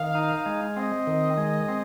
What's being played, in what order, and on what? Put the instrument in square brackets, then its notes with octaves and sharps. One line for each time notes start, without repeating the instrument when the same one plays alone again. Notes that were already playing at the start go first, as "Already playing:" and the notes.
Already playing: [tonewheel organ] D#3 [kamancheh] F5
[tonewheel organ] D#4
G#3
[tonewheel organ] C4 [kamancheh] D#5
[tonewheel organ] D#3
G#3
C4